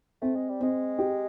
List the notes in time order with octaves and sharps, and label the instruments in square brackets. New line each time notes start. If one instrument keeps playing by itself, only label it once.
[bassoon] A3 [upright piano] C4
[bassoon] G#3
G3
[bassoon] G#3 [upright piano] C4
[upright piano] G4